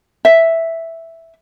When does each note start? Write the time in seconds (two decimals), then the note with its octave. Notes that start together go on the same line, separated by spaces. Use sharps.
0.25 E5